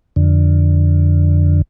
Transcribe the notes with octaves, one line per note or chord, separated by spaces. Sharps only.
F2 D3